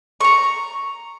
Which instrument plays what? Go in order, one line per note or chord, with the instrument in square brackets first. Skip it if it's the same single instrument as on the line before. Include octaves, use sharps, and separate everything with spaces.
[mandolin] A#5 C#6